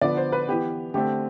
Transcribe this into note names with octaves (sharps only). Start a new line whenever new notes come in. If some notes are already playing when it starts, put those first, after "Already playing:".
D3 F3 B3 D5
C5
B4
E3 B3 G4
D3 A3 C4 G4